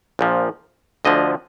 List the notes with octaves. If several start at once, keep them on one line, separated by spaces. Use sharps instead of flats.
A#1 A#2 F3
D2 D3 F3 D#5